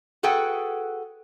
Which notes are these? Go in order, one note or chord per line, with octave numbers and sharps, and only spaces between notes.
F#4 G#4 A4 B4 F#5 G5